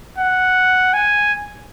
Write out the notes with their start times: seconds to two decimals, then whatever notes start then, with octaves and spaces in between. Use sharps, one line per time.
0.18 F#5
0.94 G#5